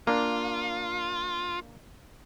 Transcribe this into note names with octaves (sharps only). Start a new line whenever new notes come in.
A#3 D4 F4